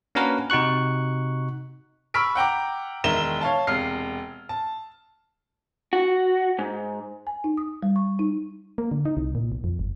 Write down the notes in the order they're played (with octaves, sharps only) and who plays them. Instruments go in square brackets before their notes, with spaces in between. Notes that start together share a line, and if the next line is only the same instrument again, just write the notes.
[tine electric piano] A#3 C#4 D4 F#4 A#4 B4
C3 D#4 F#4 C#6 F#6
[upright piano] B5 C#6 E6 F6 B6 D7
F#5 G5 A#5 D6
E1 D#3 E5 A#5 E7 G7
C#5 F5 A5
E1 C3 F6 C7
A5
[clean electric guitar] F#4
G#2
[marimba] G#5
D#4
D#6
G3
C#6
D#4
[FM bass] A#3
D3
D#4
C2
A#2
B1
F2
G1